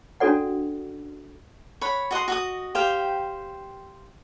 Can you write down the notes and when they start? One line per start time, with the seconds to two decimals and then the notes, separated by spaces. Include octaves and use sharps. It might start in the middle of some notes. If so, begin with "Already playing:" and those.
0.20 C#4 D4 F#4 A4 D5 F#5
1.81 C#5 F#5 B5
2.11 F#4 D#5 F#5 C6
2.28 F#4 D#5 D#6
2.75 G4 C5 F5 G5